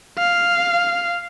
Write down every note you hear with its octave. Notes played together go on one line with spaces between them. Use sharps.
F5